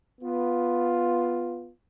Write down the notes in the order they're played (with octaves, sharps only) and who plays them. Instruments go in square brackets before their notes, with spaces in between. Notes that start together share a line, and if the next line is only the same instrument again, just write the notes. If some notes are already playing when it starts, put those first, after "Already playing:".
[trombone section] B3 F4